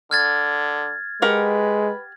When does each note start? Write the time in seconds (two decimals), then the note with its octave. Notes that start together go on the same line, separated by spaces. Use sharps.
0.11 D3 F6 G#6 A6
1.22 G#3 G4 A#4 B4 F#5